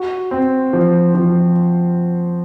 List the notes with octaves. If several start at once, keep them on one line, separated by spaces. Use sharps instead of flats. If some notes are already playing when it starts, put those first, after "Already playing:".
Already playing: F#4
C4
F3
F3